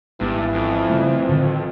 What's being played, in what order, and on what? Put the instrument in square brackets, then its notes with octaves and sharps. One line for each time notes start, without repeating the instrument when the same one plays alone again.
[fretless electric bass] G#1 B3 [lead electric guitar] G2 [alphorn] E3
[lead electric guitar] F2
[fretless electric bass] C#3 G3 A3
A2 D3 D#3